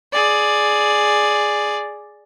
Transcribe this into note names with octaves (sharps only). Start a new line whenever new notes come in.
G#4 D5